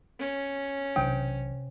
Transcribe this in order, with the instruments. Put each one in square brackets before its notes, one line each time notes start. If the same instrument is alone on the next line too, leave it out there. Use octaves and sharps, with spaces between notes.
[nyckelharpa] C#4
[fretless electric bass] B1 E3 D4 [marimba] C3 [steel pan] G5